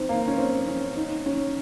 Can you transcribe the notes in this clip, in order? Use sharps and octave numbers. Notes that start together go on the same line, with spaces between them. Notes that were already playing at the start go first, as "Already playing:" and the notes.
Already playing: C4 D#4
A#3
C#4
C4
C#4
D#4
C#4